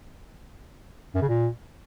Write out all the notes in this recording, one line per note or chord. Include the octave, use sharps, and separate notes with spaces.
F#2
C#3
A#2